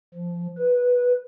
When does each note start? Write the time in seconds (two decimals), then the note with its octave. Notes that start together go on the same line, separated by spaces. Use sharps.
0.15 F3
0.57 B4